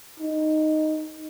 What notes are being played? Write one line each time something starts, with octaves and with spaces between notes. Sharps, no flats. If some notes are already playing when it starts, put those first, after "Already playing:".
D#4